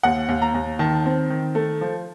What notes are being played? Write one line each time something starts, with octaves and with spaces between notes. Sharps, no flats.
D#2 F#5
D#2
A#5
D#2
D#3 A5
C4
D#3
A3
F3